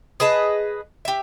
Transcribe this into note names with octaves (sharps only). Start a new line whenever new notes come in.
G#4 B4 D#5 A5
G4 E5